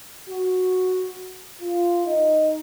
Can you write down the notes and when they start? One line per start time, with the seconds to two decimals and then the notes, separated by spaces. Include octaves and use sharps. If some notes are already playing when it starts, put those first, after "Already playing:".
0.29 F#4
1.62 F4
2.06 D#4